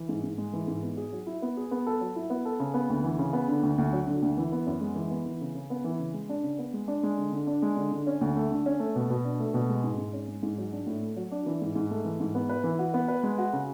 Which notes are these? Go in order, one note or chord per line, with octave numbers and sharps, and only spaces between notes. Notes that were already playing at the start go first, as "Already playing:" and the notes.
Already playing: E3
G#2
G#2
G#3
E3
G#2
B3
G#4
F#3
E4
B3
G#4
B3
A4
F#3
E4
B3
A4
C#3
B3
D2
E3
C#3
B3
D3
D2
D2
F#3
D3
D2
E3
B3
F#2
G#3
E3
B3
E3
C#3
C#3
B3
E3
C#3
G#3
D4
C#3
B3
G#3
D4
G#3
D3
D3
D4
G#3
D3
D3
C#4
D2
A3
D3
C#4
A3
B2
B2
D4
A3
B2
G#3
G#2
G#2
C#4
G#3
G#2
F#3
D4
A2
A3
F#3
D4
E3
G#2
G#2
A3
E3
G#2
B3
B4
E3
F#4
B3
B4
G#3
F#4
C#3